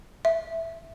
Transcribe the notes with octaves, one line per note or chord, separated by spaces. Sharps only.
E5